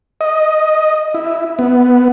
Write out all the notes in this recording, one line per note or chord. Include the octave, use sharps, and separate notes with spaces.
D#5
E4
B3